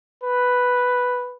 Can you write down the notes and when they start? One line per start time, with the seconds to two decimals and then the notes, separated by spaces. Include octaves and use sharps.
0.23 B4